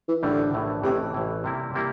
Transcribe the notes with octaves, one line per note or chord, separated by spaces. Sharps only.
E3
A#1 A2 D3 E3 G3
A#1 A2 E3 G3
A1 A2 C3 E3
A1 A2 E3
C3 G3 A#3 E4
C3 G3 A#3 E4